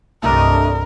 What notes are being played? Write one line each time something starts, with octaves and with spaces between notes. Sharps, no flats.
C2 G2 A3 D4 A#4 D#5